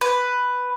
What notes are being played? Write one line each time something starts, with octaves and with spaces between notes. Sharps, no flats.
B4